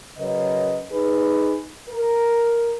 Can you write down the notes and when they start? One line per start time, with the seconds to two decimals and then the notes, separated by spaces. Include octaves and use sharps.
0.18 C#3 F#3 A#4 B4 D#5
0.92 D#4 G#4 B4
1.89 A#4